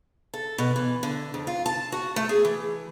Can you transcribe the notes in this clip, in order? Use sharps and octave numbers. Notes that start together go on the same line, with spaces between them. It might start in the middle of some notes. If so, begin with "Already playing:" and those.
A4
B2
E3
D3
F2
F4
A5
F#4
A3
G#4
E3